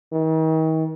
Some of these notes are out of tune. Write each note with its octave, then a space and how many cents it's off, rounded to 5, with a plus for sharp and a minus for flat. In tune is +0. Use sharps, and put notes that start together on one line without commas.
D#3 +40